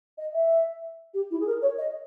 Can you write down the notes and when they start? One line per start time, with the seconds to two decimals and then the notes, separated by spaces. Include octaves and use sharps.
0.18 D#5
0.34 E5
1.14 G4
1.31 E4
1.40 G#4
1.47 A#4
1.62 C#5
1.78 D#5